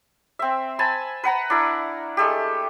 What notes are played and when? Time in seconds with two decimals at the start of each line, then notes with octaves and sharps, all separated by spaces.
0.39 C4 E5
0.79 C5 G#5 A5 B5
1.24 B4 F#5 A#5 B5
1.50 D4 E4 A#4
2.17 G#3 A3 G4